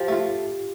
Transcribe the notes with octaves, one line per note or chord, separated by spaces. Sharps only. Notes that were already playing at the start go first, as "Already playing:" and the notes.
Already playing: F3 G4
A3 F4